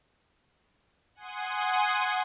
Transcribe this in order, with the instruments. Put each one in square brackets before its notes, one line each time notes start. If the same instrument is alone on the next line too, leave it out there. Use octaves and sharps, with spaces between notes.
[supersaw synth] F#5 G#5 C6 D#6